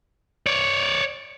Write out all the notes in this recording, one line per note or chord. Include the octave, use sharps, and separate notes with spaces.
C#5 D5